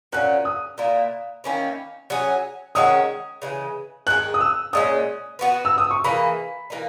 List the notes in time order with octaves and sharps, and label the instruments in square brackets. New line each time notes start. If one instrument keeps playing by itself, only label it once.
[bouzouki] A#2 F#3 C#4 [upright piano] F#6
[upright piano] D#6
[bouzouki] A#2 A#3 E4 A#4
D#3 A#3 C#4 E4
F#3 C#4 G#4
[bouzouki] D#3 G#3 C#4 F#4 [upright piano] D#6
[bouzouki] C#3 E3 G#3
[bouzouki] D#3 G#3 D#4 G#4 [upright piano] F#6
[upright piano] D#6
E6
[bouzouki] A#2 G#3 C#4 [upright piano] D#6
[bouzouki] B3 F#4 B4
[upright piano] E6
D#6
C#6
[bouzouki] E3 A#3 E4 G#4 [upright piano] B5
[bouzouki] E3 A#3 D#4